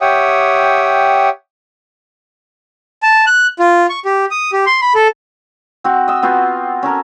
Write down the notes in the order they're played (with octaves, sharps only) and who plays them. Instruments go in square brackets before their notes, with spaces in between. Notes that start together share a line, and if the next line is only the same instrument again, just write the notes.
[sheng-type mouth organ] G4 C#5 E5 F#5 G5 D#6
A5
F#6
F4
C#6
G4
D#6
G4
C6
B5
A4
[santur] C4 F#4
D#5 E6
B3 C4 F4 F#4
C#4 A4 A#4